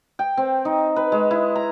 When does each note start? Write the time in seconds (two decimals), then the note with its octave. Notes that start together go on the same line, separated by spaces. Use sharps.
0.19 G5
0.37 C4
0.65 D#4
0.96 B4
1.12 G#3
1.31 E4
1.56 A#5